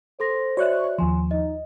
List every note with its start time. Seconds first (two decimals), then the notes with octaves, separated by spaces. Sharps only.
0.20 A4 C5 C6 A#6
0.57 F#4 C#5 D5 E5 C#6 F#6
0.98 D#2 F3 G#5 C6
1.31 D#4 D#5